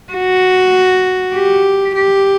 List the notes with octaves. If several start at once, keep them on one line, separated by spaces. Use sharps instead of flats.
F#4
G4
G4